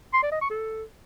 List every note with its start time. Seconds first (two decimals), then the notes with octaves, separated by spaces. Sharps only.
0.14 C6
0.23 D5
0.32 D#5
0.41 C#6
0.50 A4